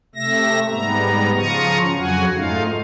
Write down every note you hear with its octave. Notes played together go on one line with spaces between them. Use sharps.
C3 A3 E5 A#6
G#2 G3 B3 A#5
C#3 F3 F4 A#5 C#6 D#6
F2 C#3 F#3 F#4 F#5 G#5
G#2 A3 D#4 F4 F5